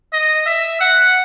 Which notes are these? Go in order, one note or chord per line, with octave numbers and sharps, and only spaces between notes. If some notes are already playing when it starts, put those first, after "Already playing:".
D#5
E5
F#5